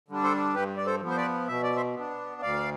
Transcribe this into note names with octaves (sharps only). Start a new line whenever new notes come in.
D3 G3 D4
A4 C5
G2 G4 B4
D5
A4 C5
F3 B3
C5
B4 D5
B2 E5
D5
C5 E5
B3 D4
D2 D5 F5